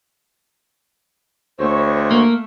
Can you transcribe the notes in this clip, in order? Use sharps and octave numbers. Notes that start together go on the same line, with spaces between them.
D2 A3 C5 C#5 C#6
A#3